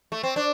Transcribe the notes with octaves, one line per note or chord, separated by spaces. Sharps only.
A3
C4
D4